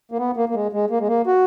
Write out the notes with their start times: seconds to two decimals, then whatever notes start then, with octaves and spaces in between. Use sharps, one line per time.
0.12 A#3
0.19 B3
0.37 A#3
0.49 A#3
0.55 G#3
0.73 G#3
0.90 A#3
1.00 G#3
1.08 A#3
1.27 F#4